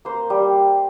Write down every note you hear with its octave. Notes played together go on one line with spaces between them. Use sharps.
A#3 C5
G3